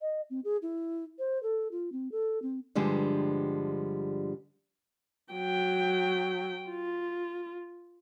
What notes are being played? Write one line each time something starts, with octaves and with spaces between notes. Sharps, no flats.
D#5
C4
G#4
E4
C5
A4
F4
C4
A4
C4
G2 D3 F3 G3 G#3
F#3 G5
F4